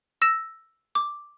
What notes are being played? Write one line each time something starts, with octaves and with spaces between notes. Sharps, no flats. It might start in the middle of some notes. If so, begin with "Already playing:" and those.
E6 A#6 E7
D6